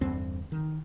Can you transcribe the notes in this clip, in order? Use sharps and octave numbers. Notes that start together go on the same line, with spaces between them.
E2 G2 D3 C4
D#3